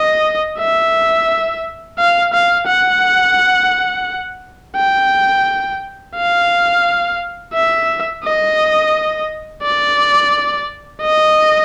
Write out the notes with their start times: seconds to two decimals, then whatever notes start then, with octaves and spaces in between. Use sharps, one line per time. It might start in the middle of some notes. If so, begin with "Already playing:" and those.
Already playing: D#5
0.59 E5
1.99 F5
2.33 F5
2.67 F#5
4.76 G5
6.16 F5
7.54 E5
8.23 D#5
9.63 D5
11.02 D#5